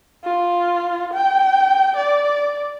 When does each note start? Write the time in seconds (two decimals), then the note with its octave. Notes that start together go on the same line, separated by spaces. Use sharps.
0.24 F4
1.13 G5
1.96 D5